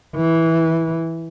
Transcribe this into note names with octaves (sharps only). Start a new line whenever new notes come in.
E3